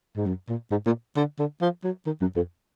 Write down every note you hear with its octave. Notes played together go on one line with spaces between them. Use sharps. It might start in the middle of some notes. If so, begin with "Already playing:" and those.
G#2
F#2
A#2
G#2
A#2
D3
D3
F3
F#3
D#3
F#2
F2